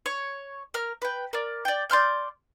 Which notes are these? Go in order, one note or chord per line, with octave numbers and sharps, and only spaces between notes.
C#5
A#4 F6
B4 G5
A#4 D5
D5 G5
D5 C6 F6 G6